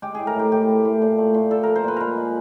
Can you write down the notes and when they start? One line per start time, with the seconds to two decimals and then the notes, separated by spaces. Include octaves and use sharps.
0.02 G#3 G4
0.15 A2 G#4
0.27 A#4
0.35 A2 G4
0.52 A2 G4
0.68 A2
0.85 A2
1.02 A#2
1.18 A3
1.34 A#2
1.51 A#2 A4
1.63 F3 A#4
1.76 C5
1.84 A#2 B4
1.96 G#3 A#4 B4
2.17 G#3